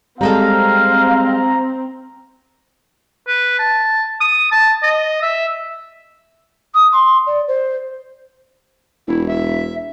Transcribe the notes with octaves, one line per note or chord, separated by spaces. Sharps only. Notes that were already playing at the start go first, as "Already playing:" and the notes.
G3 G#3 C4 A4 F5 A#5
B4
A5
D#6
A5
D#5
E5
D#6
C6
D5
C5
E1 E4
E5